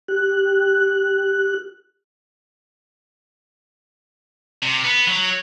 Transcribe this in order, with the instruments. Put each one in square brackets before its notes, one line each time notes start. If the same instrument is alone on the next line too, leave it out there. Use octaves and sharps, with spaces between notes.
[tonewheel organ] G4 F#6
[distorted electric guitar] C3
B3
F#3